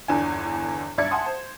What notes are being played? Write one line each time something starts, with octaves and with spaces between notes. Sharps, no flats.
G1 E2 D3 D4 G#5
B1 G2 D5 E5 G#6 C#7
E5 F#5 G#5 A5 C6 D#6
C5